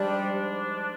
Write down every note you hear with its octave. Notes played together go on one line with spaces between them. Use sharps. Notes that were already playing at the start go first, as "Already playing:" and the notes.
Already playing: G#2 F3 G3 G#3 D4